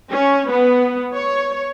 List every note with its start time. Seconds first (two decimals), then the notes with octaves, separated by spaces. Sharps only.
0.12 C#4
0.50 B3
1.13 C#5